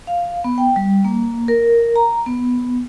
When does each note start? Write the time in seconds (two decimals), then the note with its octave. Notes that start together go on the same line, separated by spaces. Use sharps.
0.07 F5
0.44 B3
0.58 G5
0.76 G3
1.05 A#3
1.48 A#4
1.96 A#5
2.26 B3